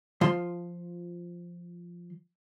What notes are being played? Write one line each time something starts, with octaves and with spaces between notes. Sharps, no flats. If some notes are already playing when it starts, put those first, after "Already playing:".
F3 F4 C6